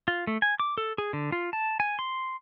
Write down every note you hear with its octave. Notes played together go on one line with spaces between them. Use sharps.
F4
A3
G#5
D6
A4
G#4
D3
F4
A5
G#5
C6